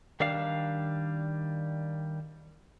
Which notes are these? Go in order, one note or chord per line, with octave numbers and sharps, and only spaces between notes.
D#3 G3 D4 F5